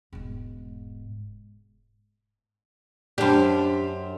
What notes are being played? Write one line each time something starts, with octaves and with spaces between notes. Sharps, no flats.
E1 G#2
F#2 D4 G4 C5